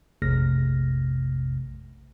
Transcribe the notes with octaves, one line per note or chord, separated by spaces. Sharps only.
A#1 F2 C3 A3 F6 A#6